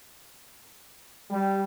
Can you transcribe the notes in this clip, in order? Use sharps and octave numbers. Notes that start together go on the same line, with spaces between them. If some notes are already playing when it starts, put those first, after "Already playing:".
G3